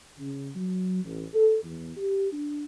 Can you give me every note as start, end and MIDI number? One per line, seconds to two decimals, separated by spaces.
0.18 0.48 49
0.55 1.00 54
1.03 1.24 33
1.33 1.61 69
1.64 1.91 40
1.97 2.29 67
2.32 2.64 62